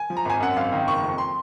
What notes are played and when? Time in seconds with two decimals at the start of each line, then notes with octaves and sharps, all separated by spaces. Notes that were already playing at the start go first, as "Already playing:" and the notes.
Already playing: G#5
0.10 F3
0.17 A#5
0.25 G#1 G#5
0.40 F#2 F#5
0.56 G#1 F5
0.72 D#3
0.87 F#1 C#6
1.04 F2
1.18 C6